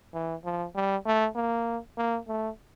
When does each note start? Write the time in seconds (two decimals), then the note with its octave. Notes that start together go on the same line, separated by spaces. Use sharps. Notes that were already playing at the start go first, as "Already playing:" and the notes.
0.14 E3
0.45 F3
0.75 G3
1.06 A3
1.35 A#3
1.98 A#3
2.28 A3